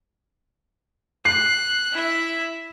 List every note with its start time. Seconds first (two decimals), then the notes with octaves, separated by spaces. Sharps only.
1.25 F#6 C7
1.93 E4 E5